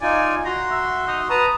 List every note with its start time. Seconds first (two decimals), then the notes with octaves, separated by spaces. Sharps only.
0.01 D#4 F4 D5 G#5
0.45 F#4 A#5 C6
0.71 E5
1.07 D#4
1.30 B4 A5 A#5 D#6